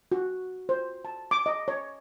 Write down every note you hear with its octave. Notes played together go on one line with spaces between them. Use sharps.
F#4
C5
A5
D6
D#5
C#5